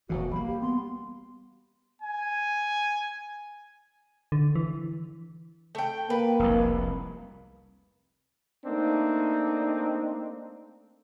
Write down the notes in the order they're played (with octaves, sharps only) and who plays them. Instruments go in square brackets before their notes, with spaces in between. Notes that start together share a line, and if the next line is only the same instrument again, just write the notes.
[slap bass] E1 A#1 A2 [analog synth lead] E3 [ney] F#4
[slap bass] G3 A#3 [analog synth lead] F5 [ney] B5
[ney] G4
[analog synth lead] B3 [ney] C6
[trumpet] G#5
[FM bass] D3
E3
[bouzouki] A3 G5
[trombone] A#3 [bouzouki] B4
[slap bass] F1 C2
[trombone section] A3 A#3 C4 D4 D#4